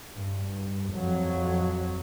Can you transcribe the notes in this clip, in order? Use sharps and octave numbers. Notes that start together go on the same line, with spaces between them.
G2
F2 F#3